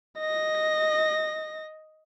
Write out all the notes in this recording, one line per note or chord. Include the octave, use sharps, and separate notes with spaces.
D#5 A#6